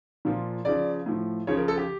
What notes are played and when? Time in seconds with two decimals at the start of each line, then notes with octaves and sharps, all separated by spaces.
0.25 A#2 F3
0.65 C#3 F3 D5
1.06 A2 F3
1.47 C#3 F3 C#5
1.57 A#4
1.68 A4
1.78 G4